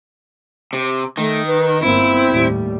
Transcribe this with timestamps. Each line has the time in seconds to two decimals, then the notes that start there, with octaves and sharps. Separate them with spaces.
0.73 C3
1.17 D#3 A3
1.46 B4
1.83 G1 A#3 C4 E4
2.28 D#2 A2 G3